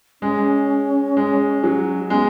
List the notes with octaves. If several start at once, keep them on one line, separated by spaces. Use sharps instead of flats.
G#3 C#4
G#3
F#3
G#3 B3